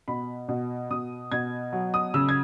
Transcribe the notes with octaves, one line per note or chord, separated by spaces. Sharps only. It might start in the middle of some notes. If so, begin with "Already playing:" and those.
B2 B5
B2
B2 D#6
B2 G#6
F#3
D#6
C#3 E6
G#6